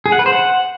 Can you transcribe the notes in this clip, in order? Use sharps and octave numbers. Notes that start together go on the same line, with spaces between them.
G#4
F#5
B4
C5
F#5